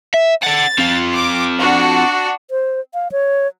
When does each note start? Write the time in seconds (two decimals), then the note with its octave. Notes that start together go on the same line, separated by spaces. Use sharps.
0.14 E5
0.43 D5 F#5 A6
0.78 C4 F4
1.15 D6
1.60 D4 F#4
2.51 C5
2.94 F5
3.12 C#5